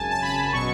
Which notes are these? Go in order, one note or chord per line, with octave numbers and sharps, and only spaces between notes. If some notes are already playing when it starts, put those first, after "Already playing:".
Already playing: G#1 F#2 C#3 G#5 A5
A5
B5
B2 F#3 C#6